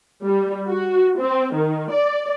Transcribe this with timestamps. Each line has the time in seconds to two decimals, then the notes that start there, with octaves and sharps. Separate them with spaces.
0.25 G3
0.67 F#4
1.18 C4
1.55 D#3
1.91 D5